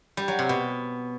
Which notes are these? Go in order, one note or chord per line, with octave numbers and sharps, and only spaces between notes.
G3
F#3
C3
B2